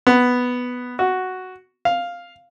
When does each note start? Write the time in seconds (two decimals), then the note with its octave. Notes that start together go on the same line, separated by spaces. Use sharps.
0.07 B3
0.99 F#4
1.85 F5